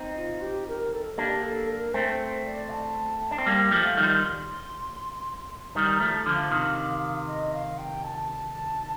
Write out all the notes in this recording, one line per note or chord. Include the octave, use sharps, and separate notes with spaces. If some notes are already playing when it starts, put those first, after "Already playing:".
Already playing: C4 D#4
F4
G4
A#4
A4
A#3 D4 G4
A4
A#4
A3 C4 C5
D5
A5
D4
C4
G3 A#3 G5
G5
F3 A3
F5
D#3 G3
C6
D#3 G3 A#5
A#5
F3 A3
A5
D3 F3
F5
C3 D#3
D#5
F5
G5
A5